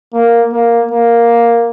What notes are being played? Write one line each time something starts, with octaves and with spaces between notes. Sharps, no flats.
A#3
A#3
A#3